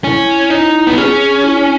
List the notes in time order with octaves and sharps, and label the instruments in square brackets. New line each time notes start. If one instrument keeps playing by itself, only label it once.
[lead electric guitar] C#4 [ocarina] E4
[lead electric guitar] D#4
B3
[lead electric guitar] C#4 [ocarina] G#4
[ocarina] E4